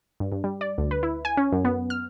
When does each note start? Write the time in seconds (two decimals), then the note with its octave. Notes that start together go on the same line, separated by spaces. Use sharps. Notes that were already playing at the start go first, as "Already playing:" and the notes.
0.20 G2
0.32 G2
0.44 G3
0.61 D5
0.78 D2
0.91 B4
1.03 E4
1.25 G#5
1.37 C#4
1.53 F#2
1.65 B3
1.90 F6